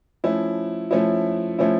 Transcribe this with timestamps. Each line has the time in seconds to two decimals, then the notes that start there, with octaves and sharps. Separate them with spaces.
0.24 F3 A3 C#4 E4
0.91 F3 A3 C#4 E4
1.59 F3 A3 C#4 E4